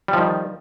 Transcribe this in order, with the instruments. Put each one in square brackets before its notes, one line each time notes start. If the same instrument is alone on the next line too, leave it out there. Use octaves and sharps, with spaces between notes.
[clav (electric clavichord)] G3
F3
D#3